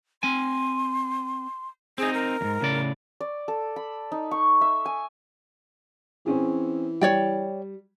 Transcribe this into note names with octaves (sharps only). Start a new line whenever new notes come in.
C4 G#5 C6
C4 D#4 G#4
A#4
E2 G#2
A2 C#3 D5
D5
A4
B5
D#4
C#6
E5
G#5
E3 C4 C#4 G#4
G3 C#5 D5 G5